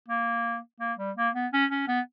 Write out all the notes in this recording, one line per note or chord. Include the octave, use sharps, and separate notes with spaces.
A#3
A#3
G3
A#3
B3
C#4
C#4
B3